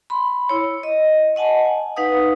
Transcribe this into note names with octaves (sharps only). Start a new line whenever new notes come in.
B5 C6
E4 C#5
D#5
D#5 F#5 G#5 A5
G#5
D#4 B4 F5 F#5 D#6